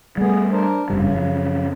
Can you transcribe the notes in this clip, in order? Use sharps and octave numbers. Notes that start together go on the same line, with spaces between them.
G3 A3 B3 G#4
D4 A#4 C5
F1 G2 C#3 G3
F#2 F3